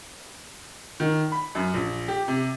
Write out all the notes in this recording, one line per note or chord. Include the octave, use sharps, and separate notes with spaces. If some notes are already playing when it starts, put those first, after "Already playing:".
D#3
B5
F#2
A#1
G4
C3